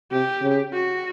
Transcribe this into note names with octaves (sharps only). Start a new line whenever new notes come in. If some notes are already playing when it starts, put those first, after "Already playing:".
C3 G4
C#3
F#4